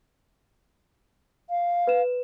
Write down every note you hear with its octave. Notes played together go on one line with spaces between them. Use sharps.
F5
B4 E7